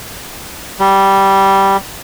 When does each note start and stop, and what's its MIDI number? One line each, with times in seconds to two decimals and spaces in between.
0.80 1.77 55